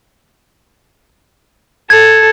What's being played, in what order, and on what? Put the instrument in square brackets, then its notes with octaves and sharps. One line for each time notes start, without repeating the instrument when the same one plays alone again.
[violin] A4 [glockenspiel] G#6